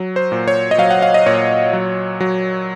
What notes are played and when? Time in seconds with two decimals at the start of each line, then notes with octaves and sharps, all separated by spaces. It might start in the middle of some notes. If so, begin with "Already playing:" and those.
Already playing: F#3
0.16 C5
0.32 A#2
0.48 C#5
0.71 D#5
0.78 F#3 F5
0.91 F#5
1.02 F5
1.14 D#5
1.26 A#2 C#5
1.73 F#3
2.20 F#3